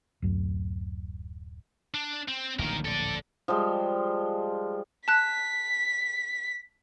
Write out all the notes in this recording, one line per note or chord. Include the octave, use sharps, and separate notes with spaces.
D1 F#2
D4
C4
D1 A#1 D#2 D#3 A#4
A4 D5
F3 G3 G#3
A5 F#6 B6